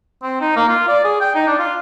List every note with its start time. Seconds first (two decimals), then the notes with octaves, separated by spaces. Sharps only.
0.23 C4
0.41 D#4
0.56 A#3
0.68 F4
0.89 D5
1.04 G#4
1.21 G5
1.35 D#4
1.47 D4
1.59 F4